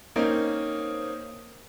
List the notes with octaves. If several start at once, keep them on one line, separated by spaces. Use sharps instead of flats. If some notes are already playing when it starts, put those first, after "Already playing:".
A#3 C4 C#4 D#4